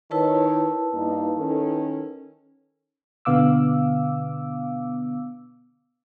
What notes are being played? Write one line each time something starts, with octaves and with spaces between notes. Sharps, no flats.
D#3 E4 B4 C#5 A5
G2 A#3 D#4
D#3 C#4 A4
B2 D3 B3 F5 D6 E6